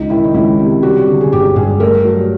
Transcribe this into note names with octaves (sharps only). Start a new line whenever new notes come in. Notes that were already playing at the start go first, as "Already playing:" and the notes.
Already playing: C#2 D#4
D#3 E4
D#4
C#2 E4
C3
G3 F#4
D3
G#4
G1 G4
G2 G#4
A3 A#4
F#3